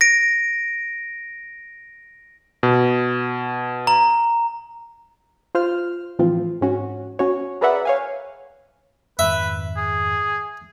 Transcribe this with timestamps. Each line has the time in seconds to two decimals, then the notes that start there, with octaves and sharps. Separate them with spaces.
0.01 A#6 D7
2.63 B2
3.87 A#5
5.55 F4 C5 F6
6.19 A2 E3 F3 C4 F4
6.61 G#2 C#4 F#4
7.19 C#4 F#4 C#5
7.61 G#4 A#4 B4 D5 E5 F#5
7.85 C#5 F5 G#5
9.19 F2 G#2 D#3 B4 E5
9.77 G#4